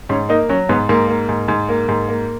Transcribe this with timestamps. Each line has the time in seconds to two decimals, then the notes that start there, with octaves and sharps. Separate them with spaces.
0.09 G#2 C#4
0.29 A#3 D#4
0.49 F#3 C#4
0.69 G#2 B3
0.89 G#2 A#3
1.08 A#3
1.29 G#2
1.48 G#2
1.69 A#3
1.88 G#2
2.09 A#3